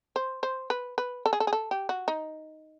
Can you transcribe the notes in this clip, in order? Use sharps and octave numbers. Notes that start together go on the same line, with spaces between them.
C5
C5
B4
B4
A4
G#4
A4
G#4
A4
G4
F#4
D#4